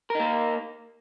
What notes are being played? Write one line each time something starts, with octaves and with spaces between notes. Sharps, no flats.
A#3 D#4 A#4